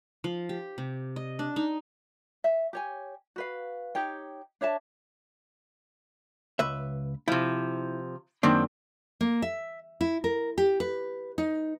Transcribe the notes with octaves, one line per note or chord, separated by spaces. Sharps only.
F3
G4
C3
D#5
D4
D#4
E5
G4 C#5 G#5
F#4 B4 F5
D#4 G4 C#5 G5
D4 C#5 E5 A5
C#2 B4 E5
C3 F3 E4
F#2 D#3 F#3 A#3 C4 D4
A#3
E5
E4
A#4
G4
B4
D#4